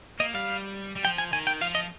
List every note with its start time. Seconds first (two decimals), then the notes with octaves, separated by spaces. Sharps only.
0.20 A#3 D#5
0.34 G3 F5
0.96 G3
1.04 F3 G5
1.18 G#5
1.33 D#3 G#5
1.47 G5
1.61 F3 F5
1.75 D#5